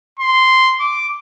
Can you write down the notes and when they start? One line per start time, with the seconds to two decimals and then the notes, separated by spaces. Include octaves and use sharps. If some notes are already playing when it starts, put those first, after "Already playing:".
0.19 C6
0.80 D6